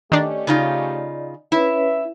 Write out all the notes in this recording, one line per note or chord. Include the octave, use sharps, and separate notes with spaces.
D#3 A3 C#4 D4 G4 D5 D#5
C#3 D#4 F4
C#4 E4 B4 C#5 E5